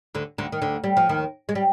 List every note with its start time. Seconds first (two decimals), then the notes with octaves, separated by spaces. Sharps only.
0.14 D2 D3
0.38 D2 D3
0.52 D#3
0.61 D2 D3
0.84 G3
0.97 F3
1.09 D#2 D#3
1.49 G#3
1.55 G3